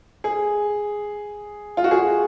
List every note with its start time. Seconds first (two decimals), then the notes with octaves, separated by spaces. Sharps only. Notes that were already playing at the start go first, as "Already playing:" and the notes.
0.24 G#4
1.77 F4
1.84 F#4
1.91 G#4